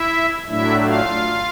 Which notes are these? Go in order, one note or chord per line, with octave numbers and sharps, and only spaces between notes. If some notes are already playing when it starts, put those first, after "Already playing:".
Already playing: E4 E5
A2 F#3 A3 D4 E4 E5
F4 F5